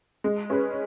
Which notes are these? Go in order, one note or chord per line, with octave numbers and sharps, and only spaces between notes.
G#3
C#4 G#4 B4